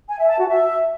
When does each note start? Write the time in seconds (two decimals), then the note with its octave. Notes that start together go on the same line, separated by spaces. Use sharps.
0.10 G#5
0.19 E5
0.29 A5
0.38 F#4
0.48 E5